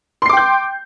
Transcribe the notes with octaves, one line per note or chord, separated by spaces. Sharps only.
G5 C6 D6 G6 C7